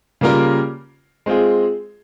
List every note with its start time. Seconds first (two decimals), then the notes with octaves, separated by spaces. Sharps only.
0.21 C#3 G3 A#3 F4 A#4
1.26 G#3 C4 F4 G#4